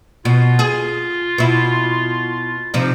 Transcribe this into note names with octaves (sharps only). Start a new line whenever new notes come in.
B2 F4
G#4
B2 E4
C3 F3 D#4